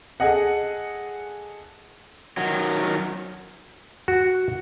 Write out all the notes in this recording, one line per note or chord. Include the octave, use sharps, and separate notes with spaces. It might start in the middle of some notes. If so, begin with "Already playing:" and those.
G#4 A4 D#5 F#5
D#3 F#3
F#4